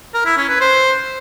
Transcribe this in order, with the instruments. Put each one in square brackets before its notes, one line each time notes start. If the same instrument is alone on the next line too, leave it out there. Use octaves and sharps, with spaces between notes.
[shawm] A#4
E4
C#4
B4
C5